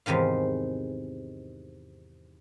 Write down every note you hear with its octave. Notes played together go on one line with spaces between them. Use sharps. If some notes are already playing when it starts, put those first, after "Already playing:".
E2 G#2 C3 D#3 F5